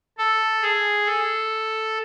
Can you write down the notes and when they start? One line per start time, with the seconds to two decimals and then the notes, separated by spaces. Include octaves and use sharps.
0.18 A4
0.61 G#4
1.06 A4